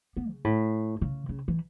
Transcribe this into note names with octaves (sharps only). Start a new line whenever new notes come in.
B3
C#3
A2
C#3
C#3
E3